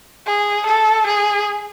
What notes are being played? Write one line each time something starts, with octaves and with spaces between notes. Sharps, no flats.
G#4
A4
G#4